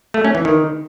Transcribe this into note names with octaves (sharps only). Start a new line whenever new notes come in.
A3
C#4
E3
D#3